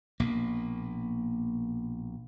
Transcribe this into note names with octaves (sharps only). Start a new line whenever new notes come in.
A#1 B2 A#3